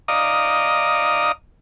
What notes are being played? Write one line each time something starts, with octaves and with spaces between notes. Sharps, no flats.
D5 D#5 F5 A#5 D#6